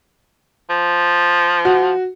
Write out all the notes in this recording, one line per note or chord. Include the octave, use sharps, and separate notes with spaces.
F3
F#4